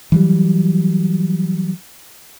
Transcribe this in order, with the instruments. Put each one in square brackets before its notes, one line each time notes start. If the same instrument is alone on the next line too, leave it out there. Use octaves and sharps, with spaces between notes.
[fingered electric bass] E3 F#3 G3